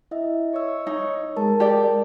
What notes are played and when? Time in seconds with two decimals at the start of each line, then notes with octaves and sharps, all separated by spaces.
0.11 E4 D#5 E5
0.53 C#5 D#5 E6
0.87 D#4
1.36 G#3 A#4 A5
1.60 G4 D5